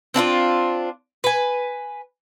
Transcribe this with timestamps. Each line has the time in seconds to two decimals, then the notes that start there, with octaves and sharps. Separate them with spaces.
0.14 C4 D4 E4 F4
1.24 B4 G#5